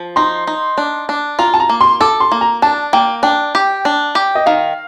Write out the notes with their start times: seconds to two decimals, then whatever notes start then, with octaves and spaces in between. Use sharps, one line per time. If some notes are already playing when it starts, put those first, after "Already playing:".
Already playing: F3
0.16 D#4 C6
0.47 D#4
0.78 D4
1.09 D4
1.39 F4 A#5
1.54 A5
1.60 A#5
1.69 A#3
1.81 C6
2.00 A4 D6
2.20 C6
2.32 A#3
2.41 A#5
2.62 D4 A5
2.93 A#3 G5
3.23 D4 G5
3.55 G4
3.85 D4
4.15 G4
4.35 D#5
4.46 D#3 F5